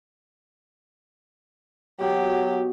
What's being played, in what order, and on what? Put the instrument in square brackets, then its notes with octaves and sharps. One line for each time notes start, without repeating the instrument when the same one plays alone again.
[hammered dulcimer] B2 [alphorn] F#3 [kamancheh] G4